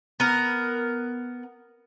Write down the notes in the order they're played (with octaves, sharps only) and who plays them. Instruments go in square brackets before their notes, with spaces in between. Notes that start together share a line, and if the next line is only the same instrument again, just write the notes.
[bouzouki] B3 A#4